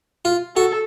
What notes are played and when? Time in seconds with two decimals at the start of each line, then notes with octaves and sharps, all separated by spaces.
0.25 F4
0.56 F#4 A4